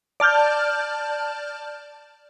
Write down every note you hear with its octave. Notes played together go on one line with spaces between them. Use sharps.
D5 A5 F6 G6